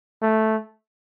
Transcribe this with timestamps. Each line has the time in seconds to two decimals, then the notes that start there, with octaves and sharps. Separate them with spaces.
0.22 A3